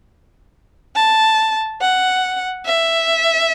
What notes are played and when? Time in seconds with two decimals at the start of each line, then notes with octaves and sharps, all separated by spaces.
0.95 A5
1.81 F#5
2.66 E5